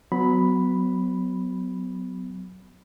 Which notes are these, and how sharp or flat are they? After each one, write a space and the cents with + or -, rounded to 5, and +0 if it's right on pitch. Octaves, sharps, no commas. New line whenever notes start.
F#3 +0 B3 +30 B5 +0